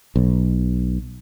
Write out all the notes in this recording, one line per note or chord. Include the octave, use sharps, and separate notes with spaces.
B1